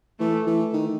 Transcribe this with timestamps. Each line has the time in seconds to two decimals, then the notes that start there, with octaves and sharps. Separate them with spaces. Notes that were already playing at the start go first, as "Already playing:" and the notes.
0.19 E3 A3
0.47 E3
0.73 D#3